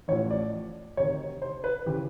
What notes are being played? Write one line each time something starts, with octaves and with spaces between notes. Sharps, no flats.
A1 A2 F3 C#5
D5
D2 C3 D#3 C#5
C5
B4
C#3 E3 G4